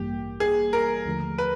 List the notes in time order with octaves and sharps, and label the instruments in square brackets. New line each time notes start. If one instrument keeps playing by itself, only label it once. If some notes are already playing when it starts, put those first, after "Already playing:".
Already playing: [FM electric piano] A1 G2 E3 G3 A#3 [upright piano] G4
[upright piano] G#4
A#4
[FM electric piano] D#2 D3 F3 A3
[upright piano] B4